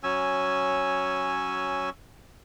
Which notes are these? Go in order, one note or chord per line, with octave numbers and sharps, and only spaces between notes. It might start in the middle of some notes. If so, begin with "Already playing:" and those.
F#3 C#4 G#5 E6